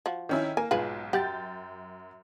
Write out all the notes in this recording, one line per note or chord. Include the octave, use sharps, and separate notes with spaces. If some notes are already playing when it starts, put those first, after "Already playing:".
F3 F#4
D#3 C#4 E4
A#3 G#5
B1 G#2 F4 G#4 B4
F#2 G4 F#5 G6 A6